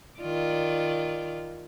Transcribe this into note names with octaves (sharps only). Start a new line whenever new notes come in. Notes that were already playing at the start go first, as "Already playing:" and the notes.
D#3 F4 D5